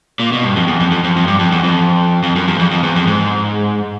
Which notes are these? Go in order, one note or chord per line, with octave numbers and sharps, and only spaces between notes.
A#2
B2
G2
F2
E2
F2
F2
F2
F2
G2
F2
E2
F2
F2
F#2
E2
F2
F2
E2
F2
G#2